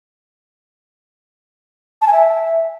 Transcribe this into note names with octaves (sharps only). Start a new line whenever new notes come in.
A5
G#5
E5